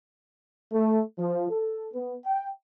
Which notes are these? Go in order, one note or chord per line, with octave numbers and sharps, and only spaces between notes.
A3
F3
A4
B3
G5